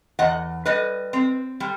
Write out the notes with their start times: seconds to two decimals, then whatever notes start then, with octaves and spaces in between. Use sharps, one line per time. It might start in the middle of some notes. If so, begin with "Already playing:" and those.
0.19 E2 D#5 F#5
0.66 G3 B4 D#5
1.13 C4
1.60 G3